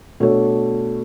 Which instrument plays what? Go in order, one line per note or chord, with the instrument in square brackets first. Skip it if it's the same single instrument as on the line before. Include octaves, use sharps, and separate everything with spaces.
[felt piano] B2 A3 D4 A4 C#5